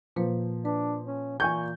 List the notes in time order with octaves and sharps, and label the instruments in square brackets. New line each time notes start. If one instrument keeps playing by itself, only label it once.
[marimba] A#2 A#3 B4 [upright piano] F3
[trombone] D4 [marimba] B4
[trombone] C#4
[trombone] A#2 [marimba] E3 [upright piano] G#5 C#6 G6